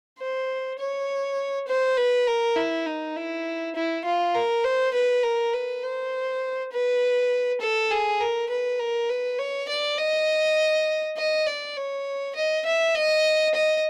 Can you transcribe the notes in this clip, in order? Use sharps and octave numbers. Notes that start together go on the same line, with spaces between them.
C5
C#5
C5
B4
A#4
E4
D#4
E4
E4
F4
A#4
C5
B4
A#4
B4
C5
B4
A4
G#4
A#4
B4
A#4
B4
C#5
D5
D#5
D#5
D5
C#5
D#5
E5
D#5
D#5